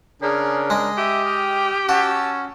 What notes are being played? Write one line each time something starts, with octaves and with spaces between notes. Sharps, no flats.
C#3 D4 G#4 A#4
G#3 D#5
G4 E5 D#6
G5 D#6 F6
C#4 F#4 A5 E6